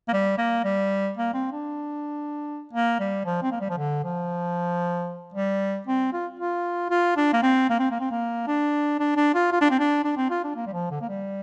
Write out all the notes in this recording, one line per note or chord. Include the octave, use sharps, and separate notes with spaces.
A#3
G3
A#3
G3
A#3
C4
D4
A#3
G3
F3
C4
A#3
G3
F3
D3
F3
G3
C4
F4
F4
F4
D4
A#3
C4
A#3
C4
A#3
C4
A#3
D4
D4
D4
F4
F4
D4
C4
D4
D4
C4
F4
D4
A#3
G3
F3
D3
A#3
G3